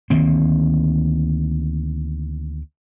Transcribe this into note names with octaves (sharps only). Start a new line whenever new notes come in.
D2 D#3 A#3 C4